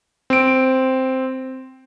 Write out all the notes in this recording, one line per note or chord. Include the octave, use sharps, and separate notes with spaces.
C4 D7